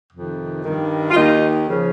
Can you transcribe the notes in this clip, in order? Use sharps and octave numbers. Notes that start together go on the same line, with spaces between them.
F2 C3 D#3
G2 D#3
F4
D#2 D#3 D#4
C#3 F3